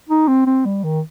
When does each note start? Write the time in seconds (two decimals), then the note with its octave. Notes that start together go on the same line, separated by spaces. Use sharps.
0.09 D#4
0.28 C4
0.46 C4
0.65 G3
0.84 D#3